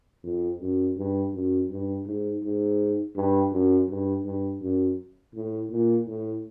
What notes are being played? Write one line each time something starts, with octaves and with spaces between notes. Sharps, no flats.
F2
F#2
G2
F#2
G2
G#2
G#2
G2
F#2
G2
G2
F#2
A2
A#2
A2